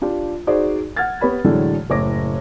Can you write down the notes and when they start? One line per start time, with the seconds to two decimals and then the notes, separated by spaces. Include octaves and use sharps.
0.01 D4 F4 G4
0.47 D#4 F#4 G#4 C5 D5
0.97 F#5 F6 G#6 A6
1.21 B3 G4 C#5 B5
1.44 A2 D3 E3 F#3 G#3 A3
1.90 F#1 A2 C#5 D6 A#6